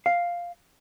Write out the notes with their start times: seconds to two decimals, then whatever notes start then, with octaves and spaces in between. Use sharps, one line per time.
0.06 F5